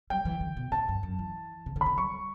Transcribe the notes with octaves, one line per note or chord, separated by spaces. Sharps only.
G3 G5
E3
D3
B2
A2 A5
G2
F#2
E3
C#3
D3
B5
D3
G3 C#6